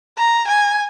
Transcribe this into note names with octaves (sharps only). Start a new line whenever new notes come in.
A#5
G#5